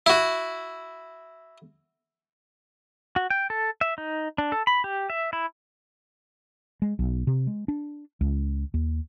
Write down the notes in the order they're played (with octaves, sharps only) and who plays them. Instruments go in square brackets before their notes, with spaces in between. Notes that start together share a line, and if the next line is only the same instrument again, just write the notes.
[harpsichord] E4 F#4
[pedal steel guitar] F#4
G5
A4
E5
D#4
D4
A4
B5
G4
E5
E4
[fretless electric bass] G#3
B1
C3
G#3
D4
C#2
D#2